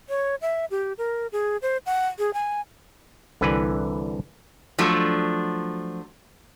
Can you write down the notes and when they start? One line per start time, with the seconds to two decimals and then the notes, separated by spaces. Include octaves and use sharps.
0.09 C#5
0.41 E5
0.71 G4
0.98 A#4
1.32 G#4
1.62 C5
1.86 F#5
2.19 G#4
2.34 G#5
3.41 C2 D3 E3 B4 G#5
4.78 F3 F#3 A3 D4